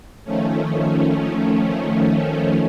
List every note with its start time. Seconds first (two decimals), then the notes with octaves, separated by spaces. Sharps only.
0.24 D#3 F3 A3 C#4